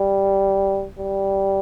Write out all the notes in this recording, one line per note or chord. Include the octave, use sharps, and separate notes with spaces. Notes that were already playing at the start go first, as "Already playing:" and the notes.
Already playing: G3
G3